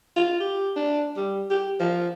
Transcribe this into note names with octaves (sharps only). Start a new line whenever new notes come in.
F4
G4
D4
G3
G4
F3